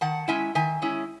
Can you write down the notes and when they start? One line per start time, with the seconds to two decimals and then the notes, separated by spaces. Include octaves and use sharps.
0.01 D#3 F#5 A5
0.28 G#3 C#4 E4 E5 G#5
0.55 D#3 E5 G#5
0.82 G#3 C#4 E4